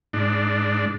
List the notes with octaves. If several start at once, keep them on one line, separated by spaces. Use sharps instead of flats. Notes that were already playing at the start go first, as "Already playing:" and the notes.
G#2 D4